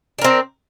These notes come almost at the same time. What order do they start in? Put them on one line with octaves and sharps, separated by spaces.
D4 A#4 C4